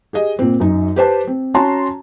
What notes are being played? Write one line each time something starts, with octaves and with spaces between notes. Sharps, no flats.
G4 G#4 D#5
A#2 C4
F#2 D#4
G4 B4 C5 A5
C4
C#4 F#4 C#5 A5 A#5 C6